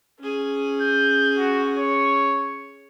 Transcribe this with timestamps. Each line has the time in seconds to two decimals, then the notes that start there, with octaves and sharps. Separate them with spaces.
0.20 C#4 G#4
0.81 G6
1.38 F#4
1.76 C#5